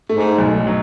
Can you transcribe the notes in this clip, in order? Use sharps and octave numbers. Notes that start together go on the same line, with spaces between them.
G#2 A3
B1
F#3